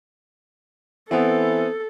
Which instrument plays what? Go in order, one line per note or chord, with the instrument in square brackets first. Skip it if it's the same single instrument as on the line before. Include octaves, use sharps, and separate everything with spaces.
[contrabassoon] E3 [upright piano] B3 C4 [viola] A4